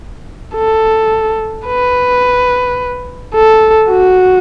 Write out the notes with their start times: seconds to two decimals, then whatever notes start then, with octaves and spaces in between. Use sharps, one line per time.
0.55 A4
1.67 B4
3.35 A4
3.90 F#4